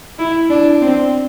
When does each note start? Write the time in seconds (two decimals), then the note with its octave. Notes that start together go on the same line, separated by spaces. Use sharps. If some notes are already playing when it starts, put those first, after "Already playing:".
0.19 E4
0.50 D4
0.82 C4